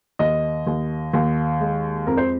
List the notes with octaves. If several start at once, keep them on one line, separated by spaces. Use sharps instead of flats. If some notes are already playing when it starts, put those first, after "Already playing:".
D#2 D#5
D#2
D#2
G#3
F2 A#4
C5